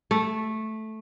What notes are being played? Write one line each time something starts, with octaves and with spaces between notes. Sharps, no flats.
A3